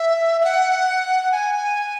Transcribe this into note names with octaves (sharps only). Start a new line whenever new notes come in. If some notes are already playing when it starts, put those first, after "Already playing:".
Already playing: E5
E5
F#5
G#5